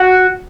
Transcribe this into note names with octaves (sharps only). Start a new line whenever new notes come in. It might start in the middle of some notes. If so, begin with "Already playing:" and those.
Already playing: F#4